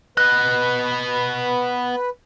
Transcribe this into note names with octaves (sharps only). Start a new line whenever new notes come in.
B3 B4 D#5 F#6